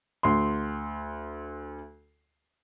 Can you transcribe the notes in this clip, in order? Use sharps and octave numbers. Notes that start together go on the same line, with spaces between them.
D2 C6